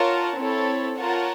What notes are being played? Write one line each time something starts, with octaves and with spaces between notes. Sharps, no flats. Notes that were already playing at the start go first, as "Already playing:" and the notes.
Already playing: F4 A#4 C#5 F#5 A5
C4 E4 A4 C#5
F4 A#4 C#5 F#5 A5